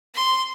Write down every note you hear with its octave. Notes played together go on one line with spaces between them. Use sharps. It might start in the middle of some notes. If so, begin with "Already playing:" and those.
C6